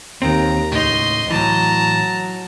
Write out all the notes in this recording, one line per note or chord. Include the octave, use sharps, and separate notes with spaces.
D#2 D#3 C4 A#5
C#2 A2 D#4 D#5 C6
A2 E3 F#3 A5 A#5